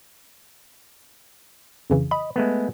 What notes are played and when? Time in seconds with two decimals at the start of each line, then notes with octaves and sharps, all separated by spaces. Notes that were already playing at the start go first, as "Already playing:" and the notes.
1.90 F2 C#3 E3
2.11 D#5 B5
2.36 G#3 A3 B3